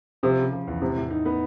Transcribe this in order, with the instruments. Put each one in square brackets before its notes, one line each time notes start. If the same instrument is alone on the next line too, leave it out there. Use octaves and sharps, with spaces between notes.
[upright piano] C3 [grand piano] F3
[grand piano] C#3
F3
E2
[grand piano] A2 [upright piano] C3
[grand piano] A2
D#4
B3